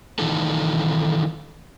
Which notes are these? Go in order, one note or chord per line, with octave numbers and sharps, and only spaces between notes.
D#3 E3 D#4 F4 A4